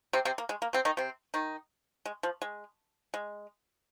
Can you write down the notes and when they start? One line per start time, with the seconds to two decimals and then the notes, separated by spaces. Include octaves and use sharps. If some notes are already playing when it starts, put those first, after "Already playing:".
0.13 C3 C4
0.25 C3 C4
0.38 A#3
0.49 G#3
0.62 A#3
0.73 C3 C4
0.85 D#3 D#4
0.97 C3 C4
1.34 D#3 D#4
2.06 G#3
2.23 F3
2.42 G#3
3.14 G#3